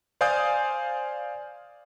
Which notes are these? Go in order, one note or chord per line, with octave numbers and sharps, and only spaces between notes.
C5 D5 F5 G#5 D#6 G6